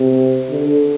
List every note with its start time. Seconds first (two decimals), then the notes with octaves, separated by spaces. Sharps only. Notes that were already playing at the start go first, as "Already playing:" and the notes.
Already playing: C3
0.51 D3